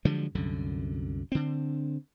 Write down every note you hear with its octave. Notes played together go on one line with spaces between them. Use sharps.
D3 F3 F#3 G#3
C2 F#2 D3
D3 C4